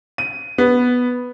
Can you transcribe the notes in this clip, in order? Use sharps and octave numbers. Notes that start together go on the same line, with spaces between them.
D#7
B3